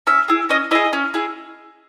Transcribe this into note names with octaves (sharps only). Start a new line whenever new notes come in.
C#4 E5
E4 G#4
C#4 D#5
E4 G#4 D#5
C#4
E4 G#4